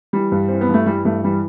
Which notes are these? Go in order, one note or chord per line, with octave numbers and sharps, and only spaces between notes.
E3 G3
G2
E3 C4
B3
G2
A3
E3 G3
G2 A3
E3 G3